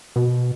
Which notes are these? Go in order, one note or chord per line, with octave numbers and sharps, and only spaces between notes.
B2